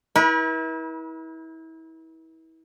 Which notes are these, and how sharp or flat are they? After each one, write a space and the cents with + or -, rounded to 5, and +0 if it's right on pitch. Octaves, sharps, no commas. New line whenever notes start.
E4 -30 B4 -45